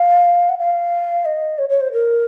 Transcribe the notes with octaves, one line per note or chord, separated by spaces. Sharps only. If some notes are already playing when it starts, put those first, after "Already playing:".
Already playing: F5
F#5
F5
D#5
C#5
C#5
C5
A#4